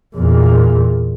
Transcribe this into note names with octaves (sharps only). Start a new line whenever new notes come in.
E2 A#2